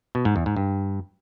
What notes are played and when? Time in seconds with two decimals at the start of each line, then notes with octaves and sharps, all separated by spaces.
0.15 B2
0.25 G#2
0.36 E2
0.46 G#2
0.57 G2